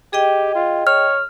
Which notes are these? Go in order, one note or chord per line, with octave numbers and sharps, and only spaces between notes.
G4 G#4 D#5 G5
F4
C#5 F6